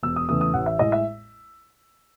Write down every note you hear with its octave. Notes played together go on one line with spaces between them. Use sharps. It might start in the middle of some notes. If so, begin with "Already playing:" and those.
E1 E6
D#6
E2 C#3 E3 A3 D#6
D#6
A1 F#5
E5
A2 G#3 D#5
E5